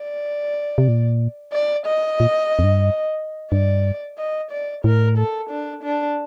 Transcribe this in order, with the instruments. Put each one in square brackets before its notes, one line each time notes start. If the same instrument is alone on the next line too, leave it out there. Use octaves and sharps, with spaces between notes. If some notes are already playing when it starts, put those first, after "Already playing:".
Already playing: [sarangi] D5
[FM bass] C3
A#2
[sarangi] D5
D#5
[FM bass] A#2
F2
G2
[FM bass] G2 [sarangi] D5
[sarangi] D#5
D5
[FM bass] A2 [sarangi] A#4
[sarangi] A4
D4
D4